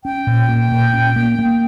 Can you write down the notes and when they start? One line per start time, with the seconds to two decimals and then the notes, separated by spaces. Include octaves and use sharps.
0.04 C#4 G5
0.27 A#2
0.49 A#3
0.72 A#2
0.94 C#4
1.16 A#3
1.39 A#3